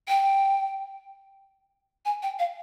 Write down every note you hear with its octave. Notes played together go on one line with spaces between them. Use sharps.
G5
G#5
G5
F5